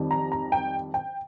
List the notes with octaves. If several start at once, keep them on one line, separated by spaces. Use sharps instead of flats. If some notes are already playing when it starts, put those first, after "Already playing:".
Already playing: F2 D#3 G3
A#5
A#5
G5
G5